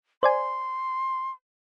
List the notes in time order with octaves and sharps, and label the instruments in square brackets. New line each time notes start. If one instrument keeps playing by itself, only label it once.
[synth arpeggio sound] C5 D5 G#5 [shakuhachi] C6